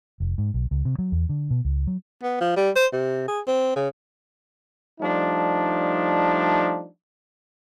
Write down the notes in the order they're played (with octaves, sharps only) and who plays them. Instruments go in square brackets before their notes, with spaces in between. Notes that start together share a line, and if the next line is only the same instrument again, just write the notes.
[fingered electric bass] F1
G#2
B1
C#2
C3
F#3
E2
D3
B2
C#2
F#3
[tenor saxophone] B3
F3
G3
C5
C3
G#4
C4
C#3
[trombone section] F3 G3 A3 D4 D#4